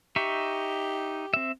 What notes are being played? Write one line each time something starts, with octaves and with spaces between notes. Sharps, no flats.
D#4 G4 E5 C#6
C4 E5